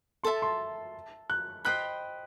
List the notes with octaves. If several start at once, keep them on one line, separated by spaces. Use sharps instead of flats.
A4 E5 A5 C6
C6
F#6
C5 D#5 G5 B5 F#6